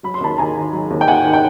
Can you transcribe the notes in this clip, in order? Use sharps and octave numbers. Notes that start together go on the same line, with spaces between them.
F#3 B5
C6
D#2 A5 B5
D#2 G#5 A#5
D#3
F#3
D#2
G5
D#2 F#5 G#5
D#3
G5